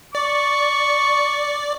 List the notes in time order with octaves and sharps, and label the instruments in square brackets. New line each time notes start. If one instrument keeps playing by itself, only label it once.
[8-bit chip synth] D5 [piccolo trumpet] C#6